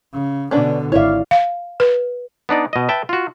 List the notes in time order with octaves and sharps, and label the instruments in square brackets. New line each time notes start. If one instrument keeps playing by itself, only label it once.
[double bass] C#3
[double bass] B2 D3 [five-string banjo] C#4 D4 B4
[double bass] G#1 [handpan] E4 D5 F5 [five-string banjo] C#5 E5
[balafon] F5
B4
[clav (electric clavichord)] B3 D4 D#4 D5
B2 D#5
B4 E5 G5 A5
F4 F#4